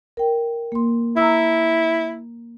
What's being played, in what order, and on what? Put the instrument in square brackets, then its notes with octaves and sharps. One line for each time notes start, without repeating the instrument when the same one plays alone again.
[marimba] A#4 G5
A#3 C6
[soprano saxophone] E4 [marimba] A#5 E6